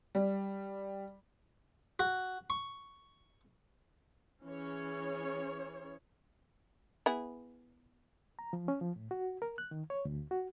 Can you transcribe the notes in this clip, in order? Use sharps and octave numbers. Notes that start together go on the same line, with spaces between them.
G3
F#4
C#6
E3 C#4 G#4 C#5
B3 E4 G#4
A#5
F3
C#4
F3
A2
F#4
A#4
F#6
D#3
C#5
D2
F#4